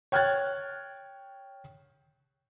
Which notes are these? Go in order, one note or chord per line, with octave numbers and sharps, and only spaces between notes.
C#5 G5 F6 F#6 G#6 A6